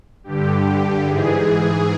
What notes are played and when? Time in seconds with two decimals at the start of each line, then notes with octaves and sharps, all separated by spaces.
0.24 G2 D3 G4
0.64 G4
1.05 G#2 E3 G#4